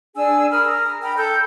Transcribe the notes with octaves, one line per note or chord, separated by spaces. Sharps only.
D4 G#4 G#5 E6
A#4 B5 D#6 F6
A#5
G5 A#5 B5
A4 E6 G6